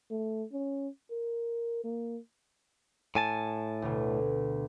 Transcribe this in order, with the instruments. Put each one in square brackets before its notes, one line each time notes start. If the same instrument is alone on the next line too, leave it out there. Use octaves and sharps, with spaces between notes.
[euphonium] A3
C#4
A#4
A#3
[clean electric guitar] A2 G#5 A5
[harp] D2 B2